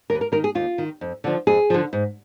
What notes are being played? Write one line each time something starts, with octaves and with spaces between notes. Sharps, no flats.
D#2 A#4
B4
A#4
D#3 A#4
G#4
D#2 F4
D#3
F2
D3 F3
F2 G#4
D3 F3
G#2